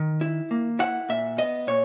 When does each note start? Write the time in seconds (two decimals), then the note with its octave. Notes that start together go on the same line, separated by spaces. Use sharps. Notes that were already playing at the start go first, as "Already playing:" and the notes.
Already playing: D#3
0.21 E4
0.51 A#3
0.79 E4 F#5
1.09 A#2 E5
1.38 B3 D#5
1.67 A#2 C#5